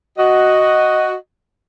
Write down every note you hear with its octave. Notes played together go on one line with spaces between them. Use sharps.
F#4 D#5